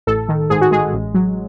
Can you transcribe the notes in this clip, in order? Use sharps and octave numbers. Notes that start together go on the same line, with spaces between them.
A1 A4
D#3
G#2 G#4
F#4
G#3 G#4
A1
F#3